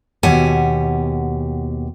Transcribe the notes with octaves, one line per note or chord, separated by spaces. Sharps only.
D#2 B2 G4 F#5 G#5